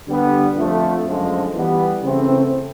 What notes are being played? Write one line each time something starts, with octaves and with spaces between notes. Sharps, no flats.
D3 G3 B3
F2 D3 F3 A3
F#2 D3 F3 G#3
E3 G3 B3
C#3 E3 A3 C4 E4